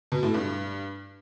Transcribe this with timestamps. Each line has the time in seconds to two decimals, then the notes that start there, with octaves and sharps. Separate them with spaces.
0.12 B2
0.23 A2
0.34 G2